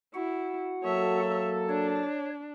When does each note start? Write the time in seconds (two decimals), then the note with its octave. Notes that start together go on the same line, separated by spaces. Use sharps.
0.15 E4 F#4 F#5
0.84 F#3 A#3 A4 C#5 E5
1.70 D4 C#5